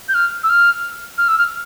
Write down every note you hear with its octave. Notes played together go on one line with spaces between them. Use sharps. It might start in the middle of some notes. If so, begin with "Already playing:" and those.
G6
F6
E6
F6
F6
E6
F6